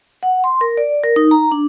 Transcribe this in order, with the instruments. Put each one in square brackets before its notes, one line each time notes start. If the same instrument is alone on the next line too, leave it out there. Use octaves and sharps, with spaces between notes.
[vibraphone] F#5
C6
A#4
D5
A#4
D#4
A#5
D4